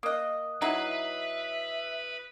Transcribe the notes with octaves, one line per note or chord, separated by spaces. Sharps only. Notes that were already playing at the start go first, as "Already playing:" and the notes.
A#3 D#5 D#6 F#6
F#3 D#4 E4 B4 E5 B5 D#6 C7